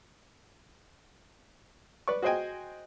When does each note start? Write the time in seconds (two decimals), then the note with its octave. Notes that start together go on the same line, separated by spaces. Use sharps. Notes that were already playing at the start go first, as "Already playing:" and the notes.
2.08 B4 D5 C#6
2.22 F#4 G#4 C5 D#5 G5 G#5